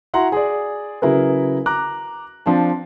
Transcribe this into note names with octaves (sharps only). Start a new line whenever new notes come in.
E4 F#4 F#5 A#5 C6
G#4 D5
C#3 F#3 E4 G#4 A#4 B4
A#5 D6 F#6
F3 C4 D4 A5